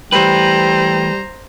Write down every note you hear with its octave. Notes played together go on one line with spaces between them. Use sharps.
E3 G3 A3 B4 C5 G5 A#5